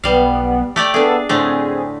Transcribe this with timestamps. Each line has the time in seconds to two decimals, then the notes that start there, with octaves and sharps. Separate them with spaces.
0.04 B1 G3 B3 F5
0.76 A3 G4 D5
0.94 B3 D4 G#4 A4 E5
1.29 A2 D3 A3 C4 G#4